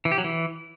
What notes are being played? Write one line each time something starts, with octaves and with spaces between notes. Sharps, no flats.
E3
G4
F#3
E3